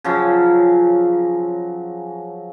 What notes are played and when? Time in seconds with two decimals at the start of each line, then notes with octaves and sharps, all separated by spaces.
0.04 C#3 F3 F#3